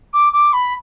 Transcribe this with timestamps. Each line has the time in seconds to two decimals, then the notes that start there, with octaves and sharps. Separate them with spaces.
0.13 D6
0.33 D6
0.53 B5